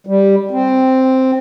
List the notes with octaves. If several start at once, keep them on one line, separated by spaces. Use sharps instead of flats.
G3
C4